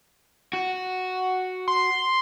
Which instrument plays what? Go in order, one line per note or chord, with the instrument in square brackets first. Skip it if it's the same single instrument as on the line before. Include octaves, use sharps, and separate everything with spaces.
[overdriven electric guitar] F#4
[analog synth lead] C6